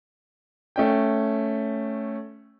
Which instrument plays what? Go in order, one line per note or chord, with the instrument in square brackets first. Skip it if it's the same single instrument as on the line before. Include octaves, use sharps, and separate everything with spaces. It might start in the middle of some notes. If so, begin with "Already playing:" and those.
[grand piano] A3 C#4 G5